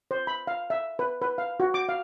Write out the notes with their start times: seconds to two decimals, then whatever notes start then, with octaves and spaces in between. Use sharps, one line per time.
0.11 C5
0.27 B5
0.47 F5
0.70 E5
0.99 B4
1.22 B4
1.38 F5
1.60 F#4
1.74 D6
1.89 F5